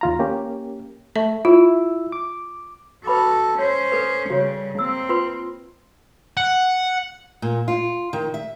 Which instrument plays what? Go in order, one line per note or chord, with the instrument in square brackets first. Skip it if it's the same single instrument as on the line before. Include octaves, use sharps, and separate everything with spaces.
[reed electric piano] D#2 F4 A#5
A#3 C#4 G4
[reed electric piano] A3 [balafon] E5
[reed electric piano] E4 E6 [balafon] F4
[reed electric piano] D6
[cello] F#4 A4 [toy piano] B4 B5 D6
[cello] C#4 C5 [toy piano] C#5
[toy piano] A4 B4
[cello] C#3 G3 [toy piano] F#4 C#5
[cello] A#3 C4 [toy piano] E6
[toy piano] F4 B4 C6
[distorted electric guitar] F#5
[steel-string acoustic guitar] A#2
F4
D#3
E5